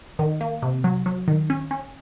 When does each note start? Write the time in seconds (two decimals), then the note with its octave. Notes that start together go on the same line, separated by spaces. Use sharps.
0.19 D#3
0.41 A#3
0.62 C3
0.84 F#3
1.06 F#3
1.28 D#3
1.50 C#4
1.71 C#4